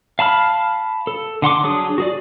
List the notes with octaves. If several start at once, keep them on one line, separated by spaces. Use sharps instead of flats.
F5 A5 B5 F6
A4
D3 F#5 C6 D6
F#3 D4 G#4 D#6
F#4 G#4 D5